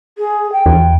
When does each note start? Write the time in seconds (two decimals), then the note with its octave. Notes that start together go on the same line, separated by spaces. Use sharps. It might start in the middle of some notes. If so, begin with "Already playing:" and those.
0.18 G#4
0.52 G5
0.66 E2